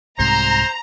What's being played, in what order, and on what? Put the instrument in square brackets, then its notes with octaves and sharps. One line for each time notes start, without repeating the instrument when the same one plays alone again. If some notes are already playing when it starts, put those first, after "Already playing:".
[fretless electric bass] C2 G#2 C3 [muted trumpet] C5 [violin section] A#5